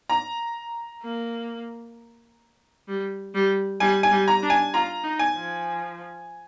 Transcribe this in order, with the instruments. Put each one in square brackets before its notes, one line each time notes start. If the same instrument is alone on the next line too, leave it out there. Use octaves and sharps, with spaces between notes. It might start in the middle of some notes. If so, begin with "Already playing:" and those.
[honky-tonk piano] A#5
[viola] A#3
G3
G3
[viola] G3 [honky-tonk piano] G#5
[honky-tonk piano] G#5
[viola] G3
[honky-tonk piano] A#5
[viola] D4
[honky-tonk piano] G#5
[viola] F4 [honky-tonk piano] A#5
[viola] D#4
[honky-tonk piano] G#5
[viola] F3